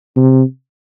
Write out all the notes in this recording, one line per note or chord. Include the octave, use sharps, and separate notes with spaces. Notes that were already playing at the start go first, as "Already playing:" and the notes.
C3